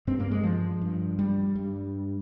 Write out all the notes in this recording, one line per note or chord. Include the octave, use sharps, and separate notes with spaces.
G2 C4
A#3
G#3
F3
G2
G3
G2